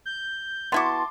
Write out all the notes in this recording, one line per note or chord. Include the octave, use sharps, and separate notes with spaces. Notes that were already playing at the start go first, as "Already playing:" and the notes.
G6
B3 E4 F#4 A5 C6 D6